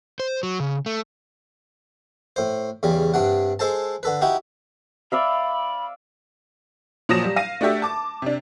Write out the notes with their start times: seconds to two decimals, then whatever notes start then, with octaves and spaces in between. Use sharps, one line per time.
0.20 C5
0.43 F#3
0.60 C#3
0.86 A3
2.36 A2 C5
2.83 E2 C#3 G3
3.14 G2 C3 D4 F#5
3.59 G#3 A4 C5 A5
4.03 D3 A4 B4
4.21 D#4 E4 F#4 G4
5.12 D5 E5 F5 B5
7.09 A#2 F3 F#3 D#6 A#6 E7
7.24 G3
7.36 F5 A#6 D#7
7.61 A3 D4 F#4 G4 E5
7.82 A5 D6
8.22 C3 D4